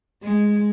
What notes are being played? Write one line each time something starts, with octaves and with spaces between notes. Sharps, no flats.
G#3